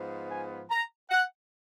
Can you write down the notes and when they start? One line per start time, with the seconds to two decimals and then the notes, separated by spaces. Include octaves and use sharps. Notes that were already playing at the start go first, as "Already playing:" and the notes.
Already playing: G#2 F3 B3
0.30 G#5
0.70 A#5
1.10 F#5